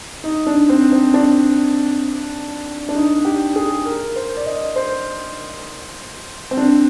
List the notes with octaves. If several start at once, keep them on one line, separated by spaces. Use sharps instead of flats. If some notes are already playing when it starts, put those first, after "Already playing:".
D#4
D4
C4
C4
D4
D4
D#4
G4
G#4
A#4
C5
D5
D#5
C5
C4
D4